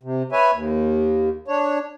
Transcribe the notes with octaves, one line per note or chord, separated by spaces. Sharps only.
C3
B4 C#5 E5 G#5
D#2
D4 C#5